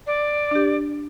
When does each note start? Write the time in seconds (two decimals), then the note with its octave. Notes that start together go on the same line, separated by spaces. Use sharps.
0.07 D5
0.51 D4 G4